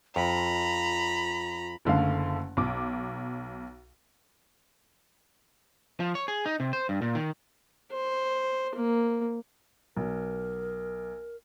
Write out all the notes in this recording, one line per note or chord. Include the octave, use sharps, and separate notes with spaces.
F2 F4 A#5 B5
F#1 D3 A3 F5
B1 D6
F3
C#5
G#4
D#4
C3
C5
G2
A#2
D#3
C5
A#3
B1 A#4